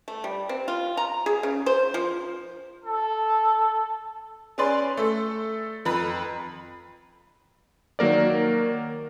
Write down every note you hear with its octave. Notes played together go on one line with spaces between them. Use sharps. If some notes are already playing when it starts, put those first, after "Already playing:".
A3
G3
C4
F4
A#5
G#4
C#3
C5
F3
A4
C#4 G#4 B4 D5 C6
A3 A4
F2 B4 A#5 B5
D#3 F#3 A#3 A#4 D5